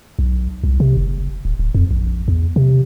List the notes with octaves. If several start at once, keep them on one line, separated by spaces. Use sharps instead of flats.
B1
C2
C3
F#1
D1
D1
F2
A#1
E2
C3